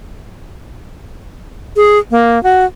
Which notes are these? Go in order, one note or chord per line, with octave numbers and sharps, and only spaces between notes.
G#4
A#3
F#4